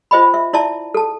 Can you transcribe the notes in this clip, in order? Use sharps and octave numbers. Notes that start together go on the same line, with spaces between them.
F4 C5 D#5 G5 B5
E5
E4 D5 E5 A5
A4 A5